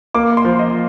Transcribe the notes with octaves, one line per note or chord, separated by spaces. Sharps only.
A#3 D6
C6
F3
D#5